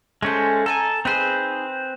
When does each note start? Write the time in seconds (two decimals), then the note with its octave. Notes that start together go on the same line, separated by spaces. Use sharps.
0.22 G#3 A3 C#4 A4 C5
0.66 A4 D#5 G#5 A#5
1.05 C4 D#4 G#4 B4 C5